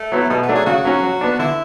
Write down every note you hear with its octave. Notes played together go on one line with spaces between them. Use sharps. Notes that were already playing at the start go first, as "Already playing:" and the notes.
Already playing: A3
F#3 B3 E4
B2 A3
B3
F#3 A3 D4
G#4
C#3 F#4
F#3 C#4
F#3
B3 D4
D3 E4